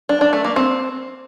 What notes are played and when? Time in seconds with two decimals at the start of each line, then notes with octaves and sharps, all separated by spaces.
0.09 D4
0.21 D4
0.33 A3
0.44 A#3
0.56 C4